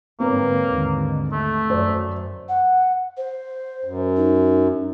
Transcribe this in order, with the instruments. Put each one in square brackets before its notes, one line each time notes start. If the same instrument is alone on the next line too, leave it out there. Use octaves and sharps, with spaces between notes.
[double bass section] G#2 D3 [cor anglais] A#3 [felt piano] C4 B4 C#5
[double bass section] D#2 G#2 D3
[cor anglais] A3
[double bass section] F#2 [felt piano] C5 D5
[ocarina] F#5
C5
[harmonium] F#2
[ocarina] D#4